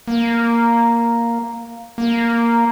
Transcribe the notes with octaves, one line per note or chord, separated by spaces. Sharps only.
A#3
A#3